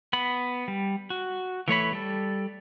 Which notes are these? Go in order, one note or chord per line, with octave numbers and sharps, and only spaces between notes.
B3 B5
G3
F#4
E3 A3 C#5 B5
G3 A4